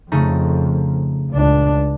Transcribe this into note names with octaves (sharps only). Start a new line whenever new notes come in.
F2 C#3 A3 D#4
C#2 D4